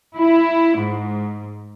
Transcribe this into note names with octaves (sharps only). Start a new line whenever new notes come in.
E4
G#2